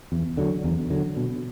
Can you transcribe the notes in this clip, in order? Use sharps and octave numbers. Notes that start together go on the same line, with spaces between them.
E2
D3 F#3
E2
D3 F#3
B2